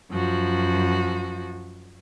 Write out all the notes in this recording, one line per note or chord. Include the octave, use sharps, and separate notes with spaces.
F#2 F3 F#4